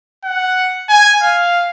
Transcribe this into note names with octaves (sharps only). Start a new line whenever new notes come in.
F#5
G#5
F5